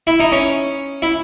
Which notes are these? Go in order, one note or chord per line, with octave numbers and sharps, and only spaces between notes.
E4
D#4
C#4
E4